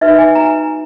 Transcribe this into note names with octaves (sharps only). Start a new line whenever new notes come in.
D#4 F#4 B4 E5
G#5
A#5